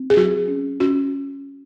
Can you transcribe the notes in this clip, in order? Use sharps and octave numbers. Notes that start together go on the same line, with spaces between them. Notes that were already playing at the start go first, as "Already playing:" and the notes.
Already playing: C4
G#4
F#3 F#4
C#4
C#4 F#4